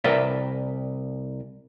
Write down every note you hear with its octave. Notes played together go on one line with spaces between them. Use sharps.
C2 A#4 B4 D5 E5